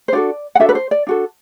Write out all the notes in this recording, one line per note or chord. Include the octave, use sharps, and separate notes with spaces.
C5
D4 F#4 A4 D5
F#5
D4 F#4 A4 E5
B4
C5
D5
D4 F#4 A4